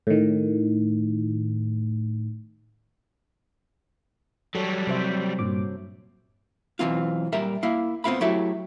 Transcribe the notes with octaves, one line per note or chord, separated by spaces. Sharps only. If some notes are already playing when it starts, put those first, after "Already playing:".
A2 D#3
F#3 G3 A4 C#5
C3 C5 E5
G2 A#2 F#3 D6
B1 F2 E3 C4 F4
A#2 G3 A#4 E5
A#3 E4 F5
B3 C4 F4 F5 B5
F#3 A3 E4 G4